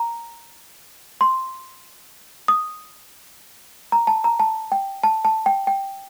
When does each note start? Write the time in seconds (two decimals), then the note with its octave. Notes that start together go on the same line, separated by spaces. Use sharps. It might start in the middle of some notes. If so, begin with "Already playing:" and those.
Already playing: A#5
1.21 C6
2.48 D#6
3.92 A#5
4.07 A5
4.24 A#5
4.40 A5
4.72 G5
5.03 A5
5.25 A5
5.46 G5
5.67 G5